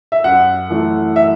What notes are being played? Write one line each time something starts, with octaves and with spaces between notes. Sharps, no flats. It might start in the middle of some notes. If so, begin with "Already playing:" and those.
E5
F#2 F#5
E3 A3
E5